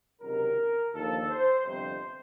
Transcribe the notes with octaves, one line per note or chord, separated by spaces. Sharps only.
C#2 C3 D#3 F#3 A#4
D#2 D3 F3 A4
C5
G1 F2 C3 C5